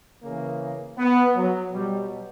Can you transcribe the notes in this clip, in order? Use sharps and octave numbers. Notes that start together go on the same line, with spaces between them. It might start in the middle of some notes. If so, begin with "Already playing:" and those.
C#3 E3 A#3
B3
F#3
B2 F#3 G3